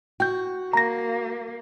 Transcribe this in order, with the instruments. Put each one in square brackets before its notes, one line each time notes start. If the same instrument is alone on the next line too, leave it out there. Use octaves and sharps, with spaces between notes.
[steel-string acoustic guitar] F#4 [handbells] G5 G6
[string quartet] A#3 [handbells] A#5 A#6